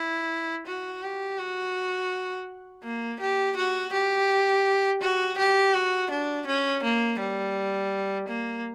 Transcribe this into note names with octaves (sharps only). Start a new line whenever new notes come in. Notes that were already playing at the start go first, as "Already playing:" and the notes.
Already playing: E4
F#4
G4
F#4
A#3
G4
F#4
G4
F#4
G4
F#4
D4
C#4
A#3
G3
A#3